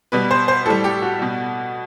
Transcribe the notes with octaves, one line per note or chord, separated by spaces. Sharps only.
B2 G3 B4
C5
C5
A2 G3 A4
G4
F#4
B2 G3